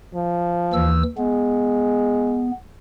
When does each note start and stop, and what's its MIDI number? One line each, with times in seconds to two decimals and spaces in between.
0.14 0.92 53
0.73 1.03 39
0.73 1.03 52
0.73 1.03 88
1.18 2.53 56
1.18 2.51 59